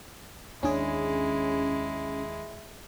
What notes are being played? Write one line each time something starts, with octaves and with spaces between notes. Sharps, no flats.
D#2 G#3 C#4 D4 E4 G#4